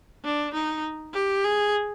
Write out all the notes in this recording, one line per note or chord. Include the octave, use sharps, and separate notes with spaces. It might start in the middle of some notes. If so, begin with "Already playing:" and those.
D4
D#4
G4
G#4